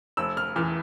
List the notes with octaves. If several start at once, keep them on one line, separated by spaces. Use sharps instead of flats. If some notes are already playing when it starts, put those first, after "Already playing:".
F1 E6
F6
E2 E3 F6